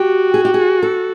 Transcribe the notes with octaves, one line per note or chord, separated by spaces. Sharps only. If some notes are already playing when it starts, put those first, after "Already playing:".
Already playing: F#4 G4
G#4
G4
G#4
A4